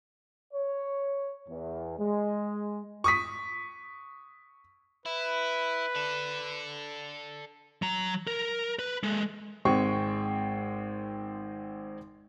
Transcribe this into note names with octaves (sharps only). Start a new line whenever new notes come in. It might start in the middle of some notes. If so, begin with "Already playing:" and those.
C#5
E2
G#3
C#6 D#6 B6
E4 B4
A4 D5
F#3 A#5
A#4
B4
G#3 A4
G#1 G#3 C4 G5 C#6